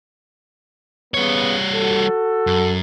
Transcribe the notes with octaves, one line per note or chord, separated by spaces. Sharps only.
C#3 G3 B3 C#5
F#4 A4
F#2